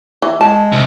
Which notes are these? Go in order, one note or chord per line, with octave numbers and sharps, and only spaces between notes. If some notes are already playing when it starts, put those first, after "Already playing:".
E3
G#3 A5
C2